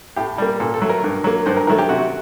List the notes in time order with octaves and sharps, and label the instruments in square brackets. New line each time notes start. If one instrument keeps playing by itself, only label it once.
[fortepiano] A2 G4
G3 A#3
A#2 A4
A4
F#3 A3
A#4
G2
F#3 A#3
G2 C5
A#4
D#3 F#3 A3 A#4
G4
C3 F#4